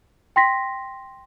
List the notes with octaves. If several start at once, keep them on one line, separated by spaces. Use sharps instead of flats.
G5 C6 A#6 B6